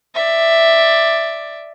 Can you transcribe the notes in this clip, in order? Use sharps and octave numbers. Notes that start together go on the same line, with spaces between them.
D5 E5